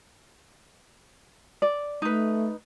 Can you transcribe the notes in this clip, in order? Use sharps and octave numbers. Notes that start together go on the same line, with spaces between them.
D5
A3 D#4 B4